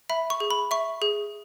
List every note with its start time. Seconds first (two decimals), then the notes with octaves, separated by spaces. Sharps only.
0.10 E5 B5
0.30 C#6
0.40 G#4
0.50 B5
0.71 E5 C#6
1.02 G#4